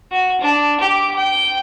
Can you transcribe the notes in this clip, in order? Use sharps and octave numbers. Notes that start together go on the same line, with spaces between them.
F#4
D4
G4 D6
G5